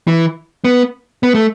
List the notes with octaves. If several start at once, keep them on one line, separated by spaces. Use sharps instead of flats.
E3
B3
B3
A3